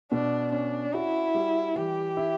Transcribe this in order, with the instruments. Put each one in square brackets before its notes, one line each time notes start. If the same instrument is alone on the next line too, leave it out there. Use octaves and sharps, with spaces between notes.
[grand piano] B2 [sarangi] D4
[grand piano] C#4 [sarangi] D4
[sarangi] E4 [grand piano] F#4
[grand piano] G3
[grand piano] E3 [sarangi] G4
[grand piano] E4